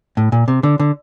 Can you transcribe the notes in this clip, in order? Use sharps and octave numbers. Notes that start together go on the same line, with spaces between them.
A2
A#2
C3
D3
D3